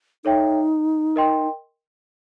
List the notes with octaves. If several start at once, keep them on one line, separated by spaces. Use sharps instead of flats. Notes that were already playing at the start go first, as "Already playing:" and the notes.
D#4 A4 C#5 E5 G5
A#4 D#5 G5 C6